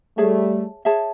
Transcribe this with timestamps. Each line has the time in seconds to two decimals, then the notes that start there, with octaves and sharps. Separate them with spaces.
0.17 G3 A3 G#4 C#5 E5 A5
0.85 G#4 C#5 E5 A5